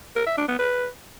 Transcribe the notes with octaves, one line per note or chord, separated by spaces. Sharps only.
A#4
E5
D4
B3
B4